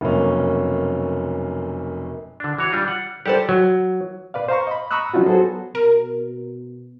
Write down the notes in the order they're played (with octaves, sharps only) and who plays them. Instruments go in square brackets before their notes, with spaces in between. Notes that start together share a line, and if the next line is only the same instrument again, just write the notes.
[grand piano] F1 F#2 B2 A#3 C#4
[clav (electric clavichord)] D3 D4
E3 F#4 C#5
G3 D4 F4
F#5
[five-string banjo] G3 A4 C5 [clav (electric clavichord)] G4 F#5
[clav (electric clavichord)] F#3
[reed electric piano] B2 B4 D5 F5
C5 F5 A#5 C#6
D#5 B5
A#5 B5 C#6 D#6 E6 F#6
F3 F#3 C#4 D#4 F4 F#4
F#3 B3 F#4 G#4 A4 C5
[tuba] B2 [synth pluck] A#4